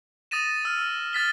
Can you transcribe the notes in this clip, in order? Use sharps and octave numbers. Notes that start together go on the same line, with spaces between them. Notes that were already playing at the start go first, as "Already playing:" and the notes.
D#6 A6 A#6 D#7 E7
E6 F6
F6 A6 B6 G7